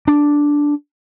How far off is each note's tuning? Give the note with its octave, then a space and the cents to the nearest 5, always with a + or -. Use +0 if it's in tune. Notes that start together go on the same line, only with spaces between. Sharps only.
D4 -5